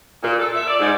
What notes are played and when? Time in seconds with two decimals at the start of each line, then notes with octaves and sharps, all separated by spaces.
0.23 A#2
0.39 A4
0.54 E5
0.67 D5
0.79 G#2